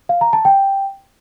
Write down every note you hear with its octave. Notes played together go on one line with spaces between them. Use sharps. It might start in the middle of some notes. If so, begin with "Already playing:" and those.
F5
A#5
A5
G5